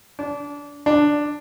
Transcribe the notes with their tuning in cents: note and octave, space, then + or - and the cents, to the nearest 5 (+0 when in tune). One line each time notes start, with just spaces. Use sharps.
D4 -25
D4 +5